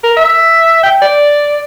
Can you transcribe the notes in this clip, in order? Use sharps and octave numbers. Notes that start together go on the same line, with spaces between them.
A#4
E5
G5
D5